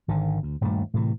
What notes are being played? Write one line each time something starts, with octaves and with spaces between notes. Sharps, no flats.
G#1 D3 D#3
D2
D#1 G2 A#2 A3
A2 C3 D#3 E3